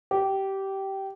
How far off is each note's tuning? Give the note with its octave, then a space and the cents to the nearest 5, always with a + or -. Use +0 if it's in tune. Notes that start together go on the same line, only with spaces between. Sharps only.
G4 -15